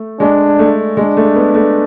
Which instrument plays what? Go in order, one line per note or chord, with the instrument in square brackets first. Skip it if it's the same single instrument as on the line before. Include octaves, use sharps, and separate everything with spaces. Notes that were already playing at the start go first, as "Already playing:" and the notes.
Already playing: [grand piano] A3
[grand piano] G#3 [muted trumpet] D4
[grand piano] A3
[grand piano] G#3 [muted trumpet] D4
[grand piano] A3
B3
A3